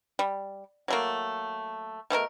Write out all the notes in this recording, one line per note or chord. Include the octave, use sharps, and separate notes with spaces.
G3
F#3 A3 A#3
B2 A3 C4 A#4